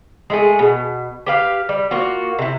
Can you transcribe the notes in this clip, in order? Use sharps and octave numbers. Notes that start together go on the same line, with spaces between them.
G#3 A3 G#4
B2
G4 B4 F5
G3
A#3 F4 F#4
C3 E4